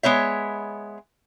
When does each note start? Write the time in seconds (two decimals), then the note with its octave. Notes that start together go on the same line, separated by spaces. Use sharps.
0.03 G#3 B3 C#5 E5